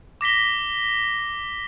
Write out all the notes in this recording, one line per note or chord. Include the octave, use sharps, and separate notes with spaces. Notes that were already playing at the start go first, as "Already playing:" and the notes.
D6 A#6 B6 G7